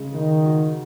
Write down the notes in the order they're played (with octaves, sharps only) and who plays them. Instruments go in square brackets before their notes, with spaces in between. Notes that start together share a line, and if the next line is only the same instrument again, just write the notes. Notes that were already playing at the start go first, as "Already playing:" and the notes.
Already playing: [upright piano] C#3 G#3
[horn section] D#3 [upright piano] D#4
[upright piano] F#4